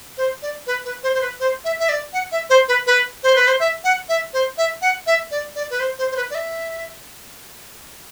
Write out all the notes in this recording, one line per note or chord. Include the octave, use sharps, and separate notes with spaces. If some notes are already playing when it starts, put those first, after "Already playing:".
C5
D5
B4
B4
C5
C5
B4
C5
E5
E5
D5
F#5
E5
C5
B4
B4
C5
B4
C5
E5
F#5
E5
C5
E5
F#5
E5
D5
D5
B4
C5
C5
C5
B4
D5
E5